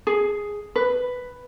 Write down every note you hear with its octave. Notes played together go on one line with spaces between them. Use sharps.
G#4
B4